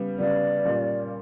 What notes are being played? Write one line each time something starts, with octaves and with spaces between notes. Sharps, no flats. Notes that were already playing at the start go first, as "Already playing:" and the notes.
Already playing: C#3 G3 B3
C#3 G3 B3 D5
A#2 G3 A#3 C#4